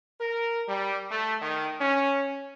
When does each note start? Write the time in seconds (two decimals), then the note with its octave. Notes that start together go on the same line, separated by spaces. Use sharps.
0.21 A#4
0.67 G3
1.11 A3
1.41 D#3
1.81 C#4